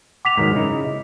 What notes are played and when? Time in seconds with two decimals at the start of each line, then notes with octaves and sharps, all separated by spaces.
0.25 F#5 D6 B6 F7
0.37 G#2 D#3 F#3
0.55 C#3 D#4 E4